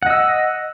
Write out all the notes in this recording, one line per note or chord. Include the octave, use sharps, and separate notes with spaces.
D#5 F#5 E6